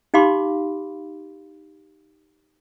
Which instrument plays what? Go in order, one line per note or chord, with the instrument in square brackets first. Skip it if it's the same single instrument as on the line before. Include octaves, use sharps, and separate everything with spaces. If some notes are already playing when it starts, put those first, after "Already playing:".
[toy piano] D#4 G4 F5 B5 C6 D6